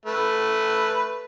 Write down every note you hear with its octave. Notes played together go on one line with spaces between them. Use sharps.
A3 B4